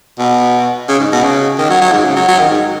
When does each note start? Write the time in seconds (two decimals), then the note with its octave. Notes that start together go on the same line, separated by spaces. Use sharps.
0.19 B2
0.88 C#3
0.99 G#2
1.12 B2
1.23 C#3
1.58 D#3
1.70 F#3
1.81 F#3
1.93 G#2
2.04 C#3
2.16 F#3
2.28 F#3
2.39 D#3
2.50 G#2